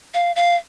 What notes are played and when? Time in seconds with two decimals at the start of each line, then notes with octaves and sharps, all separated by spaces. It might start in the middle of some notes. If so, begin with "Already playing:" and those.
0.14 F5
0.36 F5